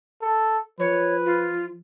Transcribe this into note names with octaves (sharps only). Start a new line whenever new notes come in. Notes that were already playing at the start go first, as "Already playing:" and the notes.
A4
F3 B4 C#5
F4